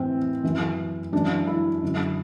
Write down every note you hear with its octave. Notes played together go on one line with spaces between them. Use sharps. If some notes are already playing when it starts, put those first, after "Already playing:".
Already playing: A2 E3 C4
F#2 E3
F#2 E3 D4
E4
F#2 D3